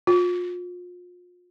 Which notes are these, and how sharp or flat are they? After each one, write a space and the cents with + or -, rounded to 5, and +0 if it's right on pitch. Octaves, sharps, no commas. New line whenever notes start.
F4 +35